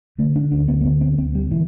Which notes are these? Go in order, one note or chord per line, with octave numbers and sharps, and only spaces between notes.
D3 A3
D4
D2 D4
B3
A3
D3 B3
C4
D2 C4
G3
B2 E3